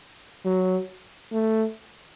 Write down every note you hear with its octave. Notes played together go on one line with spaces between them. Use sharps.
F#3
A3